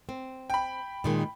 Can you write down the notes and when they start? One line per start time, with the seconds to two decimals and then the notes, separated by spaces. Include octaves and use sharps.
0.09 C4
0.50 G5 B5
1.04 A#2 D#3 G#3